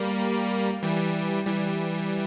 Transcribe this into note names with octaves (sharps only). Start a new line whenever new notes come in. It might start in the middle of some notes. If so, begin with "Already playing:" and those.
Already playing: G3 A#3
E3 G3
E3 G3